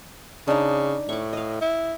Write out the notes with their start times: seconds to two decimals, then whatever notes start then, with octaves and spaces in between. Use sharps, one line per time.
0.48 C#3 D4 D#4
1.09 A2 C#6 D6
1.33 D#5 F5
1.61 E4